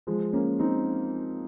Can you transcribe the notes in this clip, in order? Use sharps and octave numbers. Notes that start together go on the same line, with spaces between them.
F3 G#3
A#3 C#4
C4 D#4